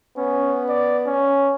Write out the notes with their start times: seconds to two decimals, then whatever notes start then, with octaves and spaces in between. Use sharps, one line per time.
0.17 B3 C#4
0.69 D5
1.06 C#4